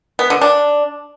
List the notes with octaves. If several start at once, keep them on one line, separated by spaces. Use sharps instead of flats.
B3
D3
D4